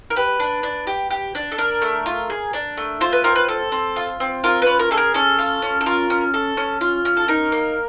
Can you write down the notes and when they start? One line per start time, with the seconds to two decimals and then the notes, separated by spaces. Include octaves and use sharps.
0.10 A#4
0.16 G4 B4
0.40 D4
0.63 D4
0.87 G4
1.10 G4
1.35 D4
1.52 A4
1.58 D4 A#4
1.82 A3
2.06 F4
2.30 G#4
2.53 D4
2.77 A3
3.01 F4 C5
3.13 B4
3.24 C4 A#4
3.35 B4
3.48 A4
3.72 C4
3.96 F4
4.20 C4
4.44 F4 A#4
4.62 C#4 B4
4.79 A#4
4.91 G#4 A4
4.97 A#4
5.14 C#4 A4
5.39 F4
5.62 C#4
5.81 A4
5.86 F4 A#4
6.10 C#4
6.34 A4
6.57 C#4
6.81 F4
7.05 C#4
7.17 A4
7.28 D#4 A#4
7.52 A#3